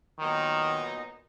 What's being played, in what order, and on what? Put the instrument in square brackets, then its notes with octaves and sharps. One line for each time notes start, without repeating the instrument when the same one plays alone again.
[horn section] A#2 F#3 B3 D#4 [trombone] D#3